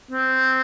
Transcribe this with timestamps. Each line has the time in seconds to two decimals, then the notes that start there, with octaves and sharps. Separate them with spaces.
0.11 C4